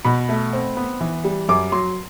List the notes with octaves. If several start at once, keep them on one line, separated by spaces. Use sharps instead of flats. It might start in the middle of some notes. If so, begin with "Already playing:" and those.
B2 B5
A3
C4
B3
E3
G3
F#2 D6
F#3 C6